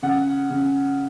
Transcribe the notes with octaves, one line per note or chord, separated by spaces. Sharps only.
C#3 F#5
C#3